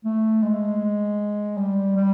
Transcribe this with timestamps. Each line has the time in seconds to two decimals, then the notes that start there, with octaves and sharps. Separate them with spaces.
0.05 A3
0.43 G#3
1.57 G3
1.96 G3